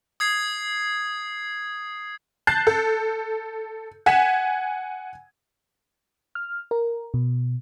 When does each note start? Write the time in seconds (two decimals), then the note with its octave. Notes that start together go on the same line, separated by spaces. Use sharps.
0.20 D#6 G#6 C7
2.47 A5 F#6 G6 A6 C7
2.67 A4
4.06 F#5 G#5 G#6 B6 E7
6.35 F6
6.71 A#4
7.14 B2